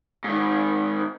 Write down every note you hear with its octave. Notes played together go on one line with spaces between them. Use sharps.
G#2 D#3